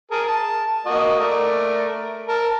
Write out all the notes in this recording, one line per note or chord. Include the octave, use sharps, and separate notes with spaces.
G#4 A#4 A5
A5
A#3 F#4 D#5
A3 A#4 D5
A#4 A5